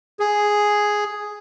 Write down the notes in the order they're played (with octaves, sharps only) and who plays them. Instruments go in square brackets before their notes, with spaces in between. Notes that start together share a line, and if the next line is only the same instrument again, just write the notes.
[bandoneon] G#4